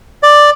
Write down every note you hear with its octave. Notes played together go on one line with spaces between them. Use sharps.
D5